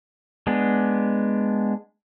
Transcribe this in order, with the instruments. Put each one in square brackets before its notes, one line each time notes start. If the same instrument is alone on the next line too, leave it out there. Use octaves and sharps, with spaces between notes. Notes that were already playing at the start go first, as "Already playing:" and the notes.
[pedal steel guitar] G#3 B3 D4